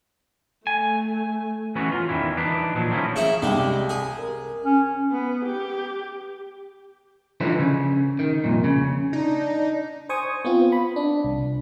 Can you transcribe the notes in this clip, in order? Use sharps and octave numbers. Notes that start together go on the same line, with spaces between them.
A3 G#5
E3 F#3 B3 C#4 F#4
F4
E2 G#2 D#3 E3 E4
E3 D4 D#4 B4
A#2 F3 F#3
D#3 F3 F#3 A3 C#4 E4
C#3 E4 A#5
C2 G3 G#3
G#4
A#4
C#4
B3
G4
D3 E3 F3 D#4 B4 C5
C#3
D#3
C2 F2 A#2
C#3
D4 D#4
C5 G#5 C#6 D#6
B3 C4 F4
B5
D4
C2